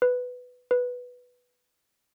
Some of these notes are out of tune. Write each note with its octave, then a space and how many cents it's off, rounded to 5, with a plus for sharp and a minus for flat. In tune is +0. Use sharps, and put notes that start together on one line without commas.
B4 +10
B4 +0